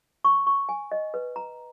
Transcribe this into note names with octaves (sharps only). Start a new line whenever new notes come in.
C#6
C#6
G#5
D#5
B4
A#5